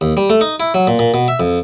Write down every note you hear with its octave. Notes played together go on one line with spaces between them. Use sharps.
D#2
G3
A3
D#4
E4
F#3
A#2
A#2
B2
E5
F2